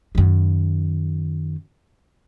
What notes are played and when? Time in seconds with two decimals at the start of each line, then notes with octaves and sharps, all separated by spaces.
0.15 F#2 D#3